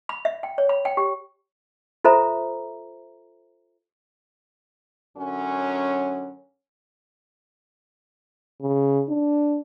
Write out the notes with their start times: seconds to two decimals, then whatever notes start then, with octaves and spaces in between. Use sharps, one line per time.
0.09 B5
0.25 E5
0.43 G5
0.58 C#5
0.69 B5
0.85 G5
0.97 G4
2.05 F4 A4 C5 E5 A#5
5.17 F#2 D3 F#3 C#4
8.62 C#3
9.09 D4